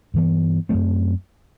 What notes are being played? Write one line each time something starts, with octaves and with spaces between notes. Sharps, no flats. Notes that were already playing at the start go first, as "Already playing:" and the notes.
G2 E3 B3
F#2 F#3 A3 C4